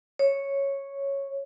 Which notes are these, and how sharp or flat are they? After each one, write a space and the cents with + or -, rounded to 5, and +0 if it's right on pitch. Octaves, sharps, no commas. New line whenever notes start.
C#5 -5